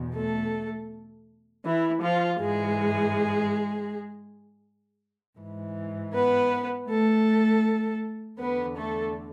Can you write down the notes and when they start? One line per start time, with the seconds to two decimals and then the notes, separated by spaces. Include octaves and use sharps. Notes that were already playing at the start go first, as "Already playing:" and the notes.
Already playing: E2 B2
0.15 A3 A4
1.64 E3 E4
2.02 F3 F4
2.40 G#2 E3 G#3 G#4
5.39 G#2 E3
6.14 B3 B4
6.89 A3 A4
8.39 E2 D3 B3 B4
8.76 A3 A4